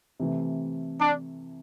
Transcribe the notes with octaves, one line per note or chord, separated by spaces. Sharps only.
C3 E3 A3
D4